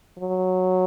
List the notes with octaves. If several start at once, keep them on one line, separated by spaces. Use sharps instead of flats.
F#3